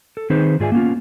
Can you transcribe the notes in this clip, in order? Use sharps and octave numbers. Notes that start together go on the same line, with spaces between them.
A4
D#3 C4 D#4 G#4 B4 C5
G#2 F4 G#4 D5 E5 G#5
A#3 B3 C#4 F4